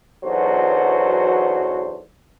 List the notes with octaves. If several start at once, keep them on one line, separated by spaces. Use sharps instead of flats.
B1 E2 F#3 D4 F#4 C5